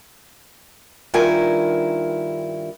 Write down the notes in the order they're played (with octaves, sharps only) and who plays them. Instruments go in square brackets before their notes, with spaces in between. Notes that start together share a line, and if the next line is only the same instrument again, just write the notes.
[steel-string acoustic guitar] G2 D#3 E4 F4 A#4 G#5